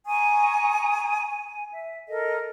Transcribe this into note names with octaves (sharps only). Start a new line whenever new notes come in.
G#5 A#5 C#6 D#6
G#5
E5
A4 A#4 D#5